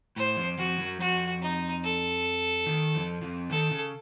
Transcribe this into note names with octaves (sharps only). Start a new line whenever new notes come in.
A2 C5
F2 F3
F2 F3 F#4
F#2 F#3
F2 F3 F#4
D#4
A4
D#3
F2 F3
F2 F3
D#3 A4
C#3